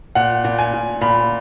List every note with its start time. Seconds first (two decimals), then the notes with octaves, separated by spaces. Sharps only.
0.15 A#2 F#5
0.44 A#2
0.59 G#5
0.73 A#2
1.01 A#2 B5